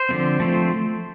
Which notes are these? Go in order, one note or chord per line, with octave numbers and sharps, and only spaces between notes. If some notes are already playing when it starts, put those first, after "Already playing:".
Already playing: C5
D3 F3 A3 C4
F3 A3 C4